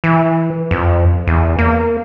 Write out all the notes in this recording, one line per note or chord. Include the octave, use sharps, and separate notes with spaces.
E3
F2
E2
A#3